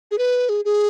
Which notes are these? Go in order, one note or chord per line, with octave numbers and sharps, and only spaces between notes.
G#4
B4
G#4
G#4